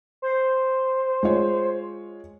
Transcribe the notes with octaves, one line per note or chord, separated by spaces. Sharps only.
C5
G#3 F4 C#5